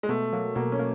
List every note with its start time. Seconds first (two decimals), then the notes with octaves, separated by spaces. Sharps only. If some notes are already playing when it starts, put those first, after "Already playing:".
0.03 G#3
0.09 B2 A3
0.32 F#3 A#3
0.55 B2 A#3
0.72 C#4
0.79 A#3